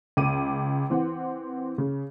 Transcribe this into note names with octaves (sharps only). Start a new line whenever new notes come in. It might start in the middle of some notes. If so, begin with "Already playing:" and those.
C#2 D6 D#7
E3 C4 F#5
C#3